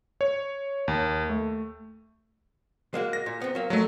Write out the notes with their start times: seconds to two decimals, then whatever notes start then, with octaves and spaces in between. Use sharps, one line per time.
0.21 C#5
0.88 D#2
1.30 A3
2.94 G#3 A#3 F#4
3.13 A#6
3.26 A#2
3.41 B3 C4
3.55 F#3 A#3
3.70 F2 F#3 A3